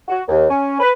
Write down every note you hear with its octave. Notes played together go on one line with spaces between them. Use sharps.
F#4
D#2
C#4
B4